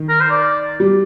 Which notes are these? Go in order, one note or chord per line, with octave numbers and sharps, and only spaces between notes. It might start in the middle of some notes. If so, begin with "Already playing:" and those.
Already playing: D#3
A#4
C5
D5
G3